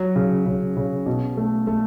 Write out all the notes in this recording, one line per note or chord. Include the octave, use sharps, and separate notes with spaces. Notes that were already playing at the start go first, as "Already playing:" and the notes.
Already playing: F#3
C#3
C#3
C#3
B2
A3
A3